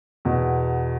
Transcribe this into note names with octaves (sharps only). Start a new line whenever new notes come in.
E2 B2